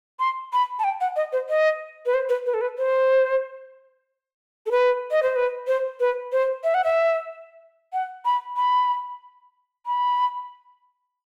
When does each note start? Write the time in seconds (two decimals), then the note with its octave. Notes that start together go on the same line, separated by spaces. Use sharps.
0.20 C6
0.53 B5
0.79 A5
0.84 G5
1.01 F#5
1.16 D#5
1.32 C5
1.49 D#5
2.06 B4
2.14 C5
2.29 B4
2.46 B4
2.54 A4
2.61 B4
2.78 C5
4.66 A4
4.71 B4
5.11 D#5
5.23 C5
5.36 B4
5.67 C5
6.00 B4
6.32 C5
6.64 E5
6.74 F#5
6.84 E5
7.93 F#5
8.25 B5
8.57 B5
9.86 B5